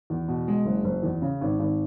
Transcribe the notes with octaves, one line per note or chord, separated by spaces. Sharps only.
E2
B2
G#3
F#1
F#1
E2
C#3
G#1
G#1